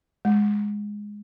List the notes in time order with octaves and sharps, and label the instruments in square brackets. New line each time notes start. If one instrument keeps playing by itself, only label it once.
[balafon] G#3